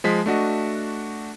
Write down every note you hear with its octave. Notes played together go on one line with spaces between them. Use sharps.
F3 G#3 B6
A3 D4 F#4 D#5